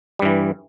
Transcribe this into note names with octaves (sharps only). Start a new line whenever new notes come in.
G2 E3 G3